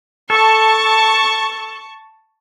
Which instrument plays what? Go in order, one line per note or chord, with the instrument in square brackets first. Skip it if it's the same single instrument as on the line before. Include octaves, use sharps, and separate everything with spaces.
[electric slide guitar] A4 [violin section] A5 C#6